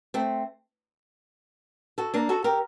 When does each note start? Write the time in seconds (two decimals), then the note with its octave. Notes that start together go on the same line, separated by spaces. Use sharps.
0.14 A3 C4
1.98 F#4 A4
2.14 A#3 D4
2.29 F#4 A4
2.44 G4 A#4